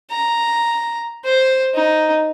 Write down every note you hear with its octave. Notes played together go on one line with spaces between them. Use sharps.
A#5
C5
D#4